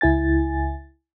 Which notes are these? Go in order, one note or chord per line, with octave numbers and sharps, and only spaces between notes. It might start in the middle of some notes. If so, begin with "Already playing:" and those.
C#2 E4 G#5 A6